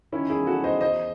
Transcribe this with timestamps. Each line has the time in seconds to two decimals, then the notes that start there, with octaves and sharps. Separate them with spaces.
0.12 D#3 C#4 E4
0.30 E4 G#4
0.35 E2
0.47 F#4 A4
0.58 E2
0.64 C5 D#5
0.81 E2 C5 D#5